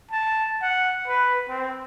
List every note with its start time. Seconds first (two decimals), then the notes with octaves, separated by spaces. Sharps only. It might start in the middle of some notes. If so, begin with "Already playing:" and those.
0.11 A5
0.62 F#5
1.08 B4
1.49 C4